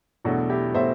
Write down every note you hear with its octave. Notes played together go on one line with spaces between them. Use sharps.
E2 B2 F#3 A3 D4 F#4
E4 G4
B2 F#3 A3 C5 E5